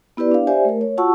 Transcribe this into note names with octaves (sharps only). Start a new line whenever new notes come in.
B3 E4 G4 B4 D5
D4 F5
G4 C5 D5 E5 G#5
A3 A#4
C#5
F4 F#4 F#5 A5 C#6 E6